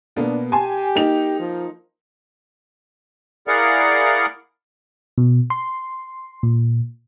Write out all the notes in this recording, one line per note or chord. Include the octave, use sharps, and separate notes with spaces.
B2 A#3 B3 D4
G4 G#5 A5 C6
A#3 D#4 F7
F3
E4 G#4 A#4 D5 F5 F#5
B2
C6
A#2